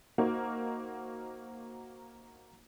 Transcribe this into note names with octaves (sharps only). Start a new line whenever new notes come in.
A#3 D#4 F#4 A#4 C5